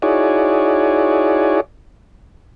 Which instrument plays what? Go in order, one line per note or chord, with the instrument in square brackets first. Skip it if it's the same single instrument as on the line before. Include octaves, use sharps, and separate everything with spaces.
[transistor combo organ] D#4 E4 F#4 G#4 C#5 D5